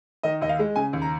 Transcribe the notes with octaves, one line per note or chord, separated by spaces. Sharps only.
D#3 D#5
D#2 D#5
F5
G#3
C#3 G#5
D#2
A#5